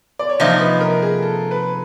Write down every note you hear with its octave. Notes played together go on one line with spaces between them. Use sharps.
D5
C#5
C3 F3 A#3 D#4 C5
B4
A#4
G#4
A4
B4